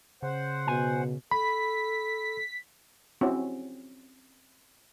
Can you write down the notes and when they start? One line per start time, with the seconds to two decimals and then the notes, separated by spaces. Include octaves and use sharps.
0.23 C#3 C5 F#5
0.67 B2 G#5
1.31 A4 B5 B6
3.21 C4 C#4 E4 F#4